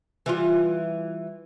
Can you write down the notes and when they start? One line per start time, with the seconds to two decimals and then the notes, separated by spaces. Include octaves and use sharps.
0.26 E3 G3 F4